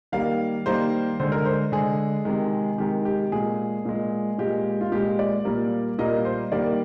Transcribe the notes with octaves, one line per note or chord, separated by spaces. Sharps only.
D#3 G3 A#3 F5
D#3 G3 A#3 C5
D3 G#3 C5
A#4
C5
D3 G#3 G#4
C3 D#3 G#3
C3 D#3 G#3 G4
G4
A#2 G#3 G#4
A#2 G#3
A#2 G#3 G4
F4
A#2 G#3 G4
D5
A#2 G3 A#3
A#2 G3 A#3 D#5
C5
D#3 G3 A#3 D5